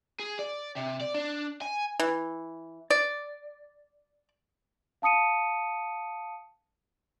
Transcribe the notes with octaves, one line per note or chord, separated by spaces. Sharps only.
G#4
D5
C3
D5
D4
G#5
E3
D5
F5 A5 D#6 C#7 D#7